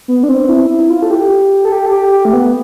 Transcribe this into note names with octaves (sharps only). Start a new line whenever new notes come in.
B3
D4
C4
E4
E4
F4
A4
G4
A4
G4
A4
G4
G4
A3
B3